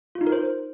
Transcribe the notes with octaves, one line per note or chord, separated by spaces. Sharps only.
F4
D#4
A#4
C5